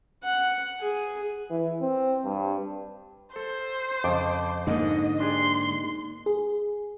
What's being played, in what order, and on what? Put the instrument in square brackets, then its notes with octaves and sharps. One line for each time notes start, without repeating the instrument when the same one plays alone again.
[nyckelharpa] F#5
G#4
[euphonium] E3
C4
G2
[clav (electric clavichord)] A4 [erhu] C5
[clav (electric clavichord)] F2 C#3 [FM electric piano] D#5 A5 D6
[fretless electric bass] G#2 D3 [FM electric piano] A#3 D#4 [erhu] D#5
[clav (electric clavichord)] D4 G4 G#4 [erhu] C6
[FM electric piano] G#4